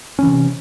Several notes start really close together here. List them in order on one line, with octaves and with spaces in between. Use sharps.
C#4 E3 C3